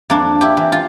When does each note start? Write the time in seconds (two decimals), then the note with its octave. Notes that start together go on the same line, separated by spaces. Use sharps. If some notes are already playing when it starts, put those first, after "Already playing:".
0.10 F2 A#3 D4
0.41 E4 G4
0.57 E3
0.72 F4